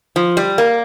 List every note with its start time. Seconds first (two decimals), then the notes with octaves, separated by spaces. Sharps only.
0.16 F3
0.37 G3
0.58 A#3